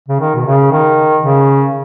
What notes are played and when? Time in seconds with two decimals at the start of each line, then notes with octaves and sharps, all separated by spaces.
0.09 C#3
0.20 D#3
0.35 B2
0.46 C#3
0.71 D#3
1.23 C#3